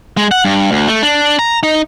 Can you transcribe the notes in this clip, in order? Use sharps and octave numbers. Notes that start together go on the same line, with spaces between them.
G#3
F#5
G2
D2
A3
D4
A#5
D#4